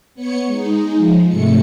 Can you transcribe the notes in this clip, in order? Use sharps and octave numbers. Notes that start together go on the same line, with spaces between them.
B3 C#5 C#7
G#3 D#4
F3 G#3
G#2 C3 A3 C#7